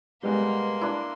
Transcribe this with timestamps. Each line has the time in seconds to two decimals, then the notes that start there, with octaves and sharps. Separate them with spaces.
0.23 B2 G3 G#3 A#3 B3 C6
0.81 D4 E4